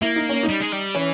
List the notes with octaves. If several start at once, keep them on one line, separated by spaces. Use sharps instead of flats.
A#3 E4
D#4
C#4
G3 D#4
G#3
G3
E3 C#4